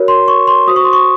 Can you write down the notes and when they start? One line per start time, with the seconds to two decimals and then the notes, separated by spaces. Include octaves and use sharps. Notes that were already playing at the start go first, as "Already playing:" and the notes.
Already playing: F#4 A#4 C#5
0.08 C6
0.28 C#6
0.47 C6
0.67 F#4 C5 D#6
0.76 C#6
0.84 C6
0.93 C#6